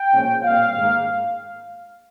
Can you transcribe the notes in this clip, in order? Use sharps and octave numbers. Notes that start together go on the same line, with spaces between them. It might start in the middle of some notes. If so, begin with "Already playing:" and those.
Already playing: G5
A#2 F3 G#3 C#4
A#2 G3 C4 F5
G#2 D#3 A#3